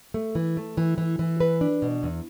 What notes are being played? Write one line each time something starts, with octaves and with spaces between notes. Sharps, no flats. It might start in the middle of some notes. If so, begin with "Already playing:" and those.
A3
E3
A3
E3
E3
E3
B4
D4
B2
E2